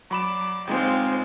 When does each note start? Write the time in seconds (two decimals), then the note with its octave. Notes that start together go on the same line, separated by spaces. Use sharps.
0.11 F#3 D5 B5 D6 E7
0.67 G1 G#3 C4 D#4 F4 F5 G5